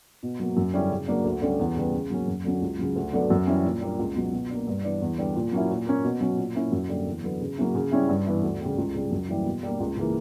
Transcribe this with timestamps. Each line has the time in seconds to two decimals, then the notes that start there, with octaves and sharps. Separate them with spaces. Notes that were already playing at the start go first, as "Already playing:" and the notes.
0.23 B2
0.40 F#3 A#3
0.57 F#2
0.73 D3 G3 C#4 E4
0.91 C#3
1.08 F#3 A#3 D4
1.24 D2
1.42 D3 G3 C#4
1.59 E2
1.76 C#3 G3 B3
1.93 C#3
2.10 F#3 A#3 C#4
2.27 F#2
2.44 D3 F#3 C#4
2.61 C#2
2.79 C#3 F#3
2.96 D2
3.13 D3 F#3 B3 D4
3.30 F#2
3.47 E3 G3 C#4 E4
3.64 A#2
3.81 G3 A#3 D4
3.99 C#2
4.15 B2 F#3
4.32 B2
4.50 A#3 D4
4.67 G2
4.84 E3 B3 D4
5.02 E2
5.18 D3 G3 B3 D4
5.35 A#2
5.53 F#3 A#3 C#4 E4
5.70 A#2
5.87 A#3 C#4
6.04 B2
6.21 F#3 C#4
6.38 A#2
6.55 A#3 C#4 E4
6.72 F#2
6.89 D3 G3 A#3 D4
7.06 E2
7.23 D3 F#3 B3
7.41 C#3
7.58 F#3 A#3 C#4 E4
7.75 C#3
7.92 G3 C#4 E4
8.09 G2
8.26 E3 B3 E4
8.43 D2
8.61 C#3 G3
8.78 C#2
8.95 C#3 G3
9.11 F#2
9.29 E3 G3 A#3 E4
9.46 B2
9.63 G3 A#3 D4
9.80 C#2
9.97 C#3 E3 A#3